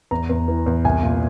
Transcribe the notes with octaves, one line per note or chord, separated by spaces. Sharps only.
E2 A#5
E2
E3
E2
C2 G#5
A#2